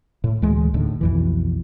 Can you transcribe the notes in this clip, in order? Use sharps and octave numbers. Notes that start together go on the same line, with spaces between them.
A2
D2 E3 G#3
D#2 A2 D3
B1 F2 E3